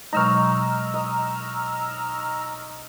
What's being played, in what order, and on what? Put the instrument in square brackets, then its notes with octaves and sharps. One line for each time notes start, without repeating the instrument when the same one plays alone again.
[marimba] B2 F#3 G#3 [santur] D#4 C#5 [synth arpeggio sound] A#5 E6 F6
[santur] D#5